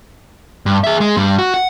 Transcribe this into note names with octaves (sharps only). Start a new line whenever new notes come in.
G2
G#4 E5
G#3
G2 G3
F#4
F#5